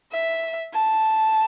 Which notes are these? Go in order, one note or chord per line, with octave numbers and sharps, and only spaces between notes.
E5
A5